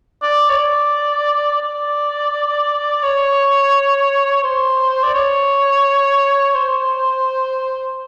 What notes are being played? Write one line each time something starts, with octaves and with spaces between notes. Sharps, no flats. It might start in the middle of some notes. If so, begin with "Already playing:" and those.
D5
C#5
D5
D5
C#5
C5
D5
C#5
C5